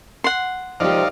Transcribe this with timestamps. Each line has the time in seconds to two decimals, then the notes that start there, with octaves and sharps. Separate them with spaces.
0.24 F#5 C6
0.80 D#2 C3 F3 G#3 D#4 G4 D5 F5